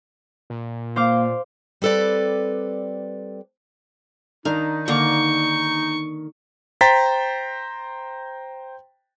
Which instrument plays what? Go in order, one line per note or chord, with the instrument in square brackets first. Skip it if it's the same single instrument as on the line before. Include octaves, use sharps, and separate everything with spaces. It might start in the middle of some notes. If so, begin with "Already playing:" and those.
[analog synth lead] A#2
[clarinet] A#3 [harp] C5 F5 D6
[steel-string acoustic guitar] G3 C4 A4 B4 D5
[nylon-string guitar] D#3 D4 [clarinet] D#4 [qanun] F5
[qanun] D3 A#3 [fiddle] C#6
[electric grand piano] C5 G5 A#5 A6 B6